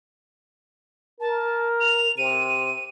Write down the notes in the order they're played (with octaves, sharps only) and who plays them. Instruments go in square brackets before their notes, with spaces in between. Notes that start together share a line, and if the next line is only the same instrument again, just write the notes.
[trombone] A#4 [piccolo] A5
[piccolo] F7
[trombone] C3 [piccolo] D#7